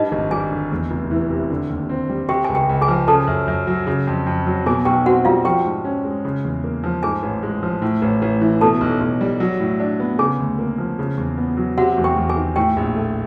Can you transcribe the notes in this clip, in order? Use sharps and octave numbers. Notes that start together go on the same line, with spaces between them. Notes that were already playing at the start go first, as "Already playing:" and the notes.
Already playing: G2 D#4 D#5
G#1
G3 G#4 G#5
D3
E2
F1
E3
C3
D3
D#2
C4
G3
C3 G4 G5
C#2 G#5
G4 G5
C#2
G#4 G#5
F3
C#3 A4 A5
F#2
F#2
F#3
C#3
F2
F2
F#3
B2 G#4 G#5
B1 G4 G5
C4 F#4 F#5
G3 F4 F5
F3 G4 G5
G#2
C#4
G#3
C#3
E2
A#3
F3
G#2 G#4 G#5
A1
G#3
F3
A2
A1
A1
E3
B2 A4 A5
B1
B1
G3
F#3
A2
D4
B3
C#3 G#4 G#5
D2
A#3
F3
C#3
E2
B3
F#3
C3 F#4 F#5
E2
G4 G5
E2
G#4 G#5
D#3
A2 G4 G5
A#1
A3